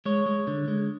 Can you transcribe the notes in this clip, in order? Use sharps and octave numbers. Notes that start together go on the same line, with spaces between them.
G#3 C#5
G#3
D3
G#3